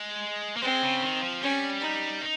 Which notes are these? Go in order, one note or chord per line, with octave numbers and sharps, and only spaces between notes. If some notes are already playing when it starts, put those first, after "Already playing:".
Already playing: G#3
A#3
G#3 C4
C#3
D#3
F3
G3 C#4
D#4
D#4